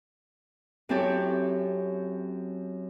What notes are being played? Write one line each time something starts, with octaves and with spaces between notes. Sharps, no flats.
F#2 C4 E4 G4 A4 C#5